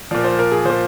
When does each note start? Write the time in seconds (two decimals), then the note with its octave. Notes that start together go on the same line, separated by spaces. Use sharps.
0.11 A#2 F3 D5
0.24 C5
0.39 A#4
0.52 G#4
0.65 A#2 F3 C5